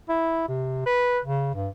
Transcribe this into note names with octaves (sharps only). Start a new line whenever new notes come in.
E4
C3
B4
C#3
G2